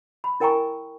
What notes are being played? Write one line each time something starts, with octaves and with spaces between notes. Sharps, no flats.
B5
E4 A#4 G5 G#5 A#5 C#6